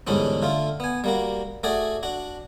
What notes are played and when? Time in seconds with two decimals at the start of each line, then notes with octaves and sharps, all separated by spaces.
0.07 E2 G#2 D3 G3 C#4 D4
0.42 D3 A3 F4
0.80 B3 G#5
1.04 G3 A#3 F#4
1.63 A3 F#4 G#4 D5
2.03 D4 F#4